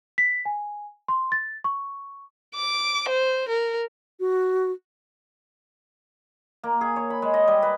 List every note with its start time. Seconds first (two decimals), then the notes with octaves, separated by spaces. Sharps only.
0.18 B6
0.45 G#5
1.08 C6
1.32 A6
1.64 C#6
2.55 D6
3.08 C5
3.48 A#4
4.20 F#4
6.63 A#3
6.81 G#4
6.96 C#5
7.10 B5
7.22 G#3
7.34 D#5
7.48 G3
7.62 B4